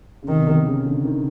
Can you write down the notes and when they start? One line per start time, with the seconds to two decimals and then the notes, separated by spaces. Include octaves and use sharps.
0.23 C#3
0.28 C3 D#3
0.40 B2
0.48 C3
0.66 C#3
0.86 D3
1.05 D#3